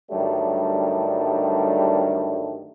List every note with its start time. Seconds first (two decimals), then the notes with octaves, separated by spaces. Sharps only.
0.11 G2 D3 D#3 F#3 G3 A3